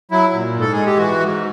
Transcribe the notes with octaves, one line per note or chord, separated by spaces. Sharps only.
F#3 E4
A#2
G#2
A4
G#3 G#4
G4
E3 F#4
G#2